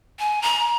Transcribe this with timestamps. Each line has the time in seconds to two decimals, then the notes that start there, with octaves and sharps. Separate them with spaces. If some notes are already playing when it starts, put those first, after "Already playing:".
0.19 G#5
0.42 A#5